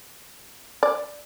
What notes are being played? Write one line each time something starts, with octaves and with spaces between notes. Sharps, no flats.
D5